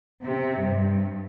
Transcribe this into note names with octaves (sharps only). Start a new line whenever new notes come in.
C3
G2